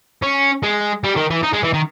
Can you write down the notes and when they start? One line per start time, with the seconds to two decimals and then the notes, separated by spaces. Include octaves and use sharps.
0.22 C#4
0.63 G#3
1.04 G3
1.16 D#3
1.30 E3
1.43 D#4
1.53 G#3
1.63 E3
1.74 D#3